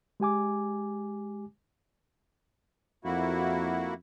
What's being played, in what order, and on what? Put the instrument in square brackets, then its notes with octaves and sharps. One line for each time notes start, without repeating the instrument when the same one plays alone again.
[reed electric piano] G#3 G4 G#5 D6
[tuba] F2 [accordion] A#3 E4 F#4